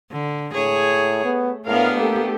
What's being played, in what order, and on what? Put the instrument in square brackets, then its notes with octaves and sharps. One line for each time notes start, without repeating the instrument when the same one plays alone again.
[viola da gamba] D3
[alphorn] A2 [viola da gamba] G#4 C#5
[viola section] A3 [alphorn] B3
[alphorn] A2 [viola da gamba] B3 D4 [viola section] G#4 A#4 F5
[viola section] A3 G4 A4 [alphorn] A#3